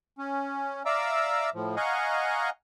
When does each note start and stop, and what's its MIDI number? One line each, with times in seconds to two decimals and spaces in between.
0.18 0.83 61
0.86 1.50 74
0.86 1.50 76
0.86 1.50 77
0.86 1.50 82
0.86 1.50 86
0.86 1.50 88
1.54 1.75 45
1.54 1.75 53
1.77 2.50 75
1.77 2.50 77
1.77 2.50 78
1.77 2.50 80
1.77 2.50 82
1.77 2.50 85